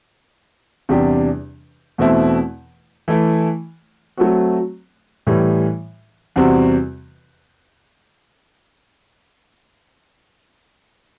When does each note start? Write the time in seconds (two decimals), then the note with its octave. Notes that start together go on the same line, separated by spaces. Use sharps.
0.89 E2 C3 G3 D4 G4
1.98 E2 B2 A3 C4 E4
3.08 E3 A3 E4
4.17 F#3 A3 C4 F#4
5.27 A2 E3 G3
6.36 E2 C3 G3 C4 F#4